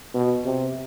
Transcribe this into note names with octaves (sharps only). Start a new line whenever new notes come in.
B2
C3